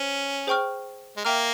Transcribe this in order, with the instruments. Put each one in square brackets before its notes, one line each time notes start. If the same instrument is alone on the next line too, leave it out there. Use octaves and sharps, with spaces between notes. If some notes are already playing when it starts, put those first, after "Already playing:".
Already playing: [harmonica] C#4 [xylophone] C5
[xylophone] G#4 C5 G5 C#6 F6
[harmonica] G#3
[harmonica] A#3 [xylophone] E5 G5 A#5 F6